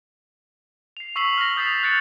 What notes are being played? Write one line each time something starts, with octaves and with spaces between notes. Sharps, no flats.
C7 F7
C#6 E6 B6 C7 F7 F#7
F6 A#6
D#6 G6 A6 B6 C7 E7
F#6 G6 A6 C#7 D7